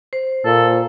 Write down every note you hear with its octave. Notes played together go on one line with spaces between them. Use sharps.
C5
A#2 A4